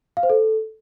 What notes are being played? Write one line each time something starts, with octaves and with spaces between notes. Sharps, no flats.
F5
C5
A4